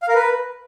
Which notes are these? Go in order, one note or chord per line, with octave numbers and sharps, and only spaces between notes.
F5
A#4
B4